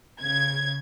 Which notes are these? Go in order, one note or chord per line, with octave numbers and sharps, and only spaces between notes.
C#3 G#6